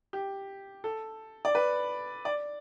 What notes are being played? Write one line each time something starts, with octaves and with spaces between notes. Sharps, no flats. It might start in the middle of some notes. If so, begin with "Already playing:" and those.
G4
A4
D5
B4
D5